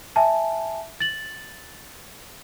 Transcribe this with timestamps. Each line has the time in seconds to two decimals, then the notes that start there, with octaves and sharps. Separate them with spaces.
0.16 E5 G#5 A5
1.00 A6 F#7